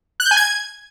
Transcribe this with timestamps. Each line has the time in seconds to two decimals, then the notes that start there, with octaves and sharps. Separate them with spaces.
0.20 F#6
0.25 G6
0.31 G#5
0.37 G#6